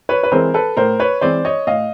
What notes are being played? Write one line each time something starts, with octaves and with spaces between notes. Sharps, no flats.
B4 C#5
B4
E3 G#3 C4 A#4 C5
A4 B4
A2 A#4 C5
B4 C#5
E3 G#3 C4 C5 D5
C#5 D#5
A2 D#5 F5